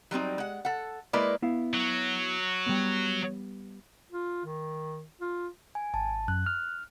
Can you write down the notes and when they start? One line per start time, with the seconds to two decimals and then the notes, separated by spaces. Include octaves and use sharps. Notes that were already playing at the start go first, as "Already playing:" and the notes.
0.11 F#3 G3 C4 D#4
0.38 G#3 F#5
0.65 A4 F#5
1.13 G#3 A#3 E4 A#4 B4 D5
1.42 B3 E4 F5
1.73 F#3
2.66 G3 B3
4.11 F4
4.45 D#3
5.21 F4
5.75 G#5
5.94 G#1 A5
6.28 F#2 F#6
6.46 F6